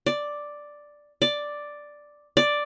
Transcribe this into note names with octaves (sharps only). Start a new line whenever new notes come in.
D5
D5
D5